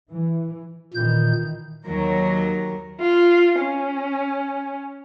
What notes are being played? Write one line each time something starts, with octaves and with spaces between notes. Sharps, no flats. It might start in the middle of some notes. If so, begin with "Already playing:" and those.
E3
A#2 D#3 E3 G6
D#2 D#3 F#3 A#4
F4
C#4